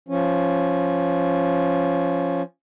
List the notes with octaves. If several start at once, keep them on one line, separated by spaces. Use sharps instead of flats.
F3 C#4